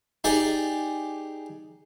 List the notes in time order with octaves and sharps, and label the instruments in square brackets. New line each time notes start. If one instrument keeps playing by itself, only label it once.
[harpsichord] D#4 G4 G#4 D5